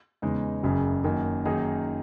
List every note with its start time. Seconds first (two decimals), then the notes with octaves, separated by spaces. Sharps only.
0.22 E2 C#3 G#3 D#4
0.63 F#1 F#2 C#3
1.04 F#2 D#3 A#3
1.45 F#2 D#3 A#3 D#4 G#4